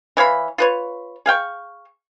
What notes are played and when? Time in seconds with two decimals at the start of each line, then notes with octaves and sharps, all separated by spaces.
0.17 E3 C#5 F5 B5
0.58 F4 B4 C#5
1.26 G#4 F5 G5 C#6